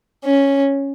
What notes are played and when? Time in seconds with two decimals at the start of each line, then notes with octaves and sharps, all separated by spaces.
0.25 C#4